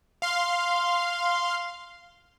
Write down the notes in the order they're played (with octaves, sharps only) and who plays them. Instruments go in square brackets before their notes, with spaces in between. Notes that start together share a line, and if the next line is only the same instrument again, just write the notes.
[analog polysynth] F5 C6